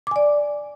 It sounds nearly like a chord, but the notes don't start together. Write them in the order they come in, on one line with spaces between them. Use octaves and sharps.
D6 G#5 D5